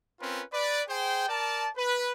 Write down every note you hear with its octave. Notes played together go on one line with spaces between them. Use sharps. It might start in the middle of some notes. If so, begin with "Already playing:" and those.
C4 C#4 F4 A#4 B4
B4 D5
G#4 C5 G5
A#4 D5 A5
B4